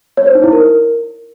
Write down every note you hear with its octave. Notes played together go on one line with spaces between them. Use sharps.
C#5
C5
D#4
E4
A#4